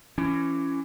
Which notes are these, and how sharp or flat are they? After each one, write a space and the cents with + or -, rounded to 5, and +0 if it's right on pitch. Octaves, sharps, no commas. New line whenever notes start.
E3 +25 C#4 +0